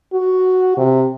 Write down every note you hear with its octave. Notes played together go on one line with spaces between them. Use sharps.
F#4
C3